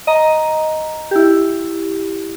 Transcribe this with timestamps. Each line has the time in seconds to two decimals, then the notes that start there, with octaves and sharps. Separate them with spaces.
0.07 D#5 A#5
1.11 E4 G4